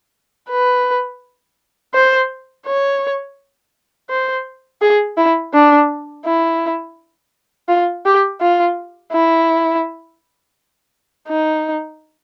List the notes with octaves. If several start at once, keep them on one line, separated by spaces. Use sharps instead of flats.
B4
C5
C#5
C5
G#4
E4
D4
E4
F4
G4
F4
E4
D#4